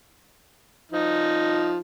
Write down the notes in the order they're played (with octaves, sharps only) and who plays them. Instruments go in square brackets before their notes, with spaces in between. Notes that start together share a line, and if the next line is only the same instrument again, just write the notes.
[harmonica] F3 D#4